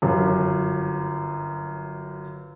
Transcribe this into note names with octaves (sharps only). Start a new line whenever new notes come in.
G1 F#2